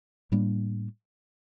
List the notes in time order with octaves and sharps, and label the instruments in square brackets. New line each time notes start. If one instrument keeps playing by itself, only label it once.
[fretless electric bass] A2 G3 A#3 D4